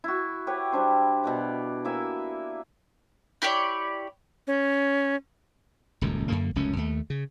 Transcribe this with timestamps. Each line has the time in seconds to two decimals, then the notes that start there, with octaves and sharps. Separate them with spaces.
0.04 E4 F#4
0.47 G4 B4 C#5 F#5
0.72 G3 D4 C5
1.24 B2 D5 F#5
1.85 A#3 E4 E5 G#5
3.42 E4 G4 C#5 D5
4.47 C#4
6.01 D#1 C#2 F#2
6.28 F#2 D3 A#3
6.55 F1 C#2 F#2 C#4
6.76 D#2 A3
7.10 C#3